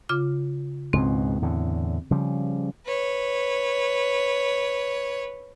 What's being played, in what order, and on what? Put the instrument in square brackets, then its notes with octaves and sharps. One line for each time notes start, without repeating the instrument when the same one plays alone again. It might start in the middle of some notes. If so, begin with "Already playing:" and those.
[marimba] C#3 F4 D6
[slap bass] C#2 G#2 B2 [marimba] C4
[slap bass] E2 A2 D3
C#3 F3 G3
[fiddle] B4 C#5